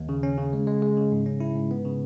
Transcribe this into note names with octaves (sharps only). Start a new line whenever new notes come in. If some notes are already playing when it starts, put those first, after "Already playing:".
Already playing: D#2
C#3
C#4
C#3
G#3
G#3
G#3
C#3
G#2
C#4
E4
G#2
B3
C#3